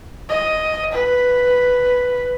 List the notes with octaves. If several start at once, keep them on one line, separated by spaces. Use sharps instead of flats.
D#5
B4